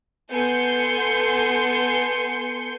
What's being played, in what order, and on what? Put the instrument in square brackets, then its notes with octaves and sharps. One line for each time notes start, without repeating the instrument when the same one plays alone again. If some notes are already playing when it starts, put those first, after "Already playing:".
[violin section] B3 A4 G#5 C6 G6 C#7